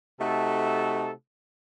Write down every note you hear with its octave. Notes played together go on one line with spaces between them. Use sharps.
C3 A3 D#4 F#4 A4